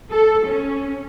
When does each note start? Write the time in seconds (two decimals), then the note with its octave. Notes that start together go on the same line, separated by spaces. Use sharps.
0.12 A4
0.45 C#4